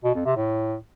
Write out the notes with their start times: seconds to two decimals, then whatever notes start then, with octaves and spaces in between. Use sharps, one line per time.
0.04 B2
0.15 F2
0.26 C3
0.37 A2